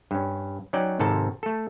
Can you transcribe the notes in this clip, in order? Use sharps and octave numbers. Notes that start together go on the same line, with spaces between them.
G2 C#4
F#3 C#4 D#4 D5 G5
G#2 C3 D#3 A4 A5
A3 A4